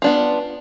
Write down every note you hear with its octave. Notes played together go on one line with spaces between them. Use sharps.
B3 D4 F4